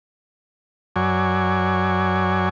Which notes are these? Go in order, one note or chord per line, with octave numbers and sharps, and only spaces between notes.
F#2 F#3 C#5 D5 G#5